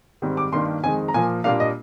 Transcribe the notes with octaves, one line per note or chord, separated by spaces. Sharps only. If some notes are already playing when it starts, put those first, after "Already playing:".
G#2 D#3 G3 C4
D6
G2 D#3 A#3 D4 C6
F2 D#3 G#3 G#5
A#5
A#2 F3 A#3 G#5
A#2 G3 A#3 D4 F5
D#5